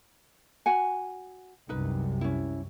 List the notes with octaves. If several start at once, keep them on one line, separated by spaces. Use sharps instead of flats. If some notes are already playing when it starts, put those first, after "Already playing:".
F#4 F#5 G#5
C2 F#2 C3 D#4 B4
C#4 E4